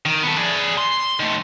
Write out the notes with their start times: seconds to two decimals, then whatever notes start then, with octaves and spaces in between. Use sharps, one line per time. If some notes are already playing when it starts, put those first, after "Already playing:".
0.06 D#3
0.23 B3 A4
0.38 G#4 D5
0.78 C6
1.19 D#3 A3